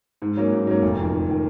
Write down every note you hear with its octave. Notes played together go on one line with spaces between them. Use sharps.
G#2
F#3 A#3 C#4
G#2
F#3 A#3 C#4
F1
F2 D#3
F1
D#3